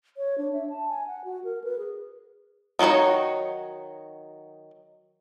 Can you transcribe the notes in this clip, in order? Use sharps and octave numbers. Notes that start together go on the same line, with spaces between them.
C#5
D4
E5
A5
G#5
F#5
F#4
A#4
B4
G#4
D#3 F#3 D#4 F#4 C#5